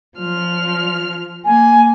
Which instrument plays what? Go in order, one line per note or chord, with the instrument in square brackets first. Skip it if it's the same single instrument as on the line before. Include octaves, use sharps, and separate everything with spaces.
[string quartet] F3 F6
[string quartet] A#3 [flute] G#5